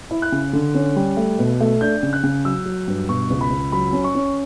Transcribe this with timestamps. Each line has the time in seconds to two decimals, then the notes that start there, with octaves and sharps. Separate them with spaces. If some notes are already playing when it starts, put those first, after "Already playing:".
0.11 E4
0.22 F#6
0.32 C#3
0.53 D3
0.74 C#4
0.96 G3
1.17 A3
1.39 B2
1.61 A3
1.81 D4 G6
2.03 C#3
2.13 F#6
2.23 C#3
2.45 F#3 E6
2.65 F#3
2.87 G2
3.09 B2 C#6
3.30 C#2
3.41 B5
3.51 C#2
3.72 F#3 B5
3.93 C#4
4.04 C#6
4.15 C#4